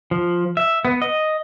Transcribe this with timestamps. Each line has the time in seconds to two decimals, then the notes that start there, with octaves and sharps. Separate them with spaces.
0.11 F3
0.57 E5
0.85 B3
1.02 D#5